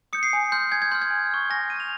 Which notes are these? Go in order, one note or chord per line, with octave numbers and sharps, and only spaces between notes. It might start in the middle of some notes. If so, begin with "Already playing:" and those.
D#6 G6 C#7
C7
G#5
C6 F6 G6
G#5 G#6
G#6
C6 F6 G6
G#6
G#5
C#6 F6
G#5 A#6
C#6 F6 D#7
F7